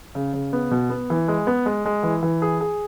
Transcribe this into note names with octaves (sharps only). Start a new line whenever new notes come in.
C#3
C#3
B3
B2
B3
E3
G#3
B3
G#3
G#3
E3
E3
G#4
G#4